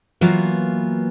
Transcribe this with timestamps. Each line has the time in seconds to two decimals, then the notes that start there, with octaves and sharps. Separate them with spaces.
0.21 E3 F#3 A#3 B3 F4